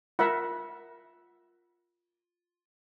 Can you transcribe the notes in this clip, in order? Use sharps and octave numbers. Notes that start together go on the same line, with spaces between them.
F4 A#4 E5 F#5